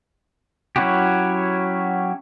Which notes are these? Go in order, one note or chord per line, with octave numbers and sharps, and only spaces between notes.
F#3 C#4 E4 F#4 G4